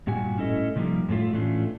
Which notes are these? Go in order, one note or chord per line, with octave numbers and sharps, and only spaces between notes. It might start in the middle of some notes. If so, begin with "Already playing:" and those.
G2 A#2 G3 F#4 G#5
A2 C#4 E4 A4 D#5
C3 F3 G3 A#3 D#4
F#2 A2 A3 F4
A2 E3 A3 C#4 D4 F4